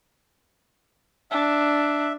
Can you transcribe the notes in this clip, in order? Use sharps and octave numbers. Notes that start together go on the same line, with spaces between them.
D4 E5